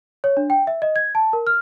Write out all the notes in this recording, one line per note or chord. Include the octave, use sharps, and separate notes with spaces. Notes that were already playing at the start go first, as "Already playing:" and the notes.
C#5
D4
G5
E5
D#5
G#6
A5
A#4
F6